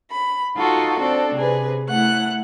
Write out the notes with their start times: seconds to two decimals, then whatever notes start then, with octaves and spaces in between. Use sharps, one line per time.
0.11 B5
0.57 D#4 F4 F#4 A4
0.97 C4 D4 A4
1.35 C3 G#4 B4
1.89 A3 E4 F#5 F#6